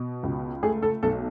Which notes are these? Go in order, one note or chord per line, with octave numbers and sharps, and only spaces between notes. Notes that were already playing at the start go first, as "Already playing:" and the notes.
Already playing: B2
C#2
A3 G#4
A4
B1 A4